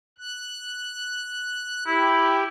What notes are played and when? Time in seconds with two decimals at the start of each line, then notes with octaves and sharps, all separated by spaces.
0.18 F#6
1.87 E4 G4